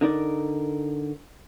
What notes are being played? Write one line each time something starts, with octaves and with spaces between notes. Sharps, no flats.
D3 D#4 A#4 D5